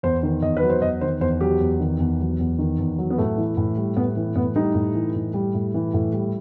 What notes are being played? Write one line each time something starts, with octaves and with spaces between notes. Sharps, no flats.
E2 C5
D#3
E2 D#5
B4
F#3
C5
E2 D#5
D#3 C5
E2 C5
F#3 G4
E2
D#3
E2
F#3
E2
D#3
E2
F#3
B3
A2 A3
E3
A2
G3
A2 B3
E3
A2 B3
G3 D#4
A2
E3
A2
G3
A2
E3
A2
G3